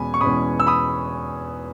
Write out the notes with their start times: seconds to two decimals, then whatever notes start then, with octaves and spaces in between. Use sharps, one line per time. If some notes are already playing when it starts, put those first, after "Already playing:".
Already playing: E2 B2 G#3 C#4 G#5 B5
0.14 C#6
0.21 E2 B2 G#3 C#4 B5 D#6
0.60 E6
0.67 B5 D#6